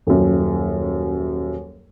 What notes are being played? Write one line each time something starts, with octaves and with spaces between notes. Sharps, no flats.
D#1 F#2